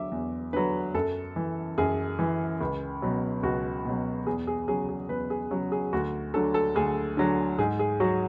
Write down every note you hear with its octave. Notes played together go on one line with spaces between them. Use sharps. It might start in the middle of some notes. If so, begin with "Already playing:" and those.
Already playing: E2 D3 F#3 E5 D6
E2
D3 F#3 B4
F#2 A4
E3
F#2 G#4
E3
C#2
B2 F#3
C#2 F#4
B2 F#3
E2 G#4
G#4
C#3 F#3 G#4
G#4
E2 B4
G#4
C#3 F#3 F#4
G#4
D2 F#4
D3 F#3 A4
A4
D2 G#4
D3 F#3
G#2 G#4
G#4
F#3 F#4